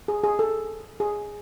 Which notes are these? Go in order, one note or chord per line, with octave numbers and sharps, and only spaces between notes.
G#4
G#4
A4
G#4